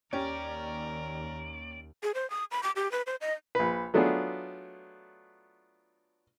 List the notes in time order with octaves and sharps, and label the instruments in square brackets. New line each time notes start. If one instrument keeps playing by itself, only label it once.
[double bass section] D#2 [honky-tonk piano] C#4 G4 [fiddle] A#4 [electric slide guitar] D5
[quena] G#4
C5
D#6
B5
D6
G4
B4
C5
D#5
[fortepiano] A#1 B4
F#3 A3 B3 D4 F4 G#4